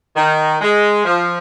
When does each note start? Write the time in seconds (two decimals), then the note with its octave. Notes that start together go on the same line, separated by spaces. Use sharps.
0.16 D#3
0.61 G#3
1.05 F3